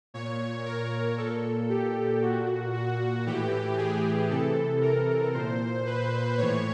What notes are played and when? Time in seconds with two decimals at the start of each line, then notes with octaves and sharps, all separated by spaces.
0.14 A#2 C#5
0.66 A#4
1.17 A#2 A4
1.70 G4
2.22 A#2 F#4
2.74 F#4
3.26 A2 E3 G4
3.78 G#4
4.30 C3 E3 A4
4.82 A#4
5.34 A#2 C5
5.86 B4
6.38 A2 E3 C#5